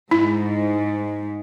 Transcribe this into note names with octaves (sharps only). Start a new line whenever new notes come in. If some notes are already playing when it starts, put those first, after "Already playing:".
G#2 E4